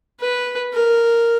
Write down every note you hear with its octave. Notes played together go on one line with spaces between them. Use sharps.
B4
A#4